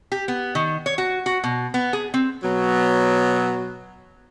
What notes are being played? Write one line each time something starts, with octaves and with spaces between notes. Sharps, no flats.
G4
B3
D#3
C#5
F#4
F#4
B2
B3
G#4
C4
B2 F#3